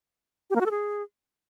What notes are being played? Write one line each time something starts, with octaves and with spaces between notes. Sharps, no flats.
G4
A#3
F#4
A4
G#4